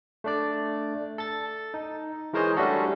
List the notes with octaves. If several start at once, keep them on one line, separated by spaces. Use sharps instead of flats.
A3 D4 D5
A4 A6
D#4
E3 G#3 A#4 C5 C#5 D#5
G3 A3 C#4 D4 F#4 A4